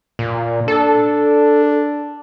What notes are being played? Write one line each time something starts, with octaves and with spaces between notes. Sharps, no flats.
A#2
D4 A4